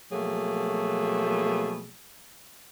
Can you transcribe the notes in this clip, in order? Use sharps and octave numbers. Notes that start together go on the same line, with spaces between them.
B2 F3 F#3 A3 A#3 G#4